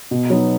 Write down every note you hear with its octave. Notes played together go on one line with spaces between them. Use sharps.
B2
F#3 B3 D#4